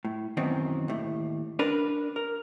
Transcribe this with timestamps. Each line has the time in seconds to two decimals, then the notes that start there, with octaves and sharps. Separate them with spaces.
0.05 A2
0.37 F#2 B2 D#3 E3 F#3 C4
0.88 D#2 A2
1.59 D4 A#4 B4
2.16 A#4